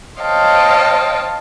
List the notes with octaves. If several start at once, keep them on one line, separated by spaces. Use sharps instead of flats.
C5 C#5 D#5 F5 G5 A5